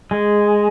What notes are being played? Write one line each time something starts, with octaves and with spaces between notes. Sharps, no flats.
G#3